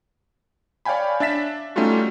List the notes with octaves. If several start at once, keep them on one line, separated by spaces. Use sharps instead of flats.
C#5 D5 F5 G5 G#5 B5
D4 E5 A6 B6 E7
G3 A3 C#4 D#4 F4 F#4